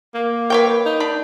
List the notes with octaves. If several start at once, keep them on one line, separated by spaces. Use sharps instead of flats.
A#3
A#4 B4 C#5 G5
D#4
D4 B5